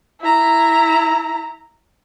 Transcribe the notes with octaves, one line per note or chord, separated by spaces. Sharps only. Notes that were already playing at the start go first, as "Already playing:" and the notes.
E4 A#5